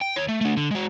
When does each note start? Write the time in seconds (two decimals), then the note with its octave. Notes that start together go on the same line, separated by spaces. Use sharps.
0.01 G5
0.16 D#2 C#5
0.28 A3
0.41 A3 D4
0.57 D3
0.71 G#3 F#4